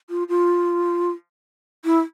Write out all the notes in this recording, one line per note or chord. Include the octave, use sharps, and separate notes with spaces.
F4
F4
E4